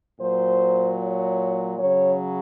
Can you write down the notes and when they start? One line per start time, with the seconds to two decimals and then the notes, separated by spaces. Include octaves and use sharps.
0.20 A#2 F#3 C5
1.00 C#5
1.78 C#3 F#3 C#5